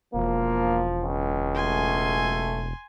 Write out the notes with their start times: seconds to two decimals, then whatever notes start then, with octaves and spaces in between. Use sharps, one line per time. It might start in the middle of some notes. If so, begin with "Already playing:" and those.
0.14 E1 F3 A#3
1.02 C#2
1.55 F#3 A3 G#5 C6